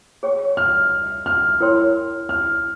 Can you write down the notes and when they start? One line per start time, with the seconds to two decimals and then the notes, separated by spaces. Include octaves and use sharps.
0.23 G#4 C#5 G5 C#6
0.57 F6
1.26 F6
1.60 E4 A#4 C#5 G5 C6
2.29 F6